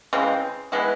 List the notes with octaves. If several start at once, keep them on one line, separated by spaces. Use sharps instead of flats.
C#3 E3 G#3 C4
E3 G#3 B3 E4